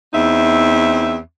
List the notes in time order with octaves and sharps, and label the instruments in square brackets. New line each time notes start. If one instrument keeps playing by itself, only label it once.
[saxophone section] E2 C4 D#4 E5